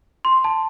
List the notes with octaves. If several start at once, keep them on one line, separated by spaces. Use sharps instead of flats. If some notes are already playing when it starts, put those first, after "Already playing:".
C6
A5